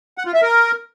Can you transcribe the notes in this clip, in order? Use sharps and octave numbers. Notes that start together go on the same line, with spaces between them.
F#5
F4
E5
A#4